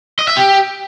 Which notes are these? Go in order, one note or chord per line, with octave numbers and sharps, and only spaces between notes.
D#5
E5
G4